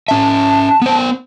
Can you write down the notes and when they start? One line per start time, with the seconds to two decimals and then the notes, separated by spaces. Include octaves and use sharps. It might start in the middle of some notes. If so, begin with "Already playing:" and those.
0.08 C#4 E5 A5
0.82 B3 C5